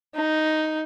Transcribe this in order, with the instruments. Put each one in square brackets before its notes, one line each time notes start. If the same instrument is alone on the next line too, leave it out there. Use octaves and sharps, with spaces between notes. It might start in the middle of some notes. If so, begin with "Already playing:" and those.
[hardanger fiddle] D#4